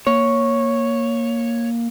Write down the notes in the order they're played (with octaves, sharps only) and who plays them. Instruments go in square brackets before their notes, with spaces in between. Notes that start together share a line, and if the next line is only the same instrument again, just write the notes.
[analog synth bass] A#3 [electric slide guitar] C#5